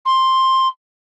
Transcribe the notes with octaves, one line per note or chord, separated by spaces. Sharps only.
C6